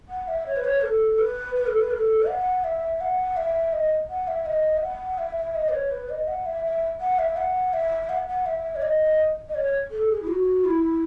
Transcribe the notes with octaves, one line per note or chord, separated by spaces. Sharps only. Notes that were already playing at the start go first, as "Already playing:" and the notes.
F#5
E5
C#5
B4
C#5
A4
B4
B4
A4
B4
A4
F#5
E5
F#5
E5
D#5
F#5
E5
D#5
E5
F#5
E5
E5
D#5
B4
C#5
B4
D#5
F#5
E5
E5
F#5
E5
F#5
E5
F#5
F#5
E5
C#5
D#5
D#5
C#5
A4
G#4
E4
F#4
E4